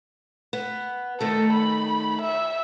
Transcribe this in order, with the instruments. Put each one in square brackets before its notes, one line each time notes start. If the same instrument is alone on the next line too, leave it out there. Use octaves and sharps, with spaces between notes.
[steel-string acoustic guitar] B3
[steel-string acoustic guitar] D#3 A3 [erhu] A4
[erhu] B5
E5